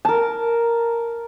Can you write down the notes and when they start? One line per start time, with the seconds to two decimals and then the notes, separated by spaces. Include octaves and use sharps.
0.05 A#4 A5